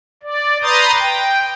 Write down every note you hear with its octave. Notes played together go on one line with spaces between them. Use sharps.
D5
B4 A#5 C6 D#6 G6 A6
G5